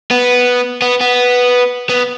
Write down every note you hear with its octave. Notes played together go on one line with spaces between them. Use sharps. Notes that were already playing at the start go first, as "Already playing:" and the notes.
B3
B3
B3
B3